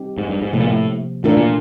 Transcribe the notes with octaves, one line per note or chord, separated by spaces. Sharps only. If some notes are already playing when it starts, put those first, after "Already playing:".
Already playing: G3 C4 D#4 G4
G#2
G2
G#2
A2 C3 F3 A#3
A#2
A2
A2 E3 A3 D4 F4 A#4
A#2